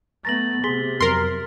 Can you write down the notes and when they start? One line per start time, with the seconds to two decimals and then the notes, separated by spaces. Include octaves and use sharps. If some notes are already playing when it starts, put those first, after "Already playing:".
0.25 A3 B3 A#5 A6 A#6 F#7
0.64 C3 G#4 C6 B6 G7
1.01 F2 F#3 A#4 C6 F6